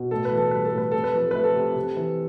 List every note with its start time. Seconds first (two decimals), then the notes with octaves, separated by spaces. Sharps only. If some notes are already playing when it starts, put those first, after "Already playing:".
Already playing: B2
0.11 A2 A4
0.25 B4
0.31 E3
0.37 A4
0.51 G3 B4
0.65 A4
0.73 A2
0.78 B4
0.92 C3 A4
1.04 B4
1.14 F3 A4
1.31 A3 B4
1.44 A4
1.55 C3
1.76 C3
1.97 E3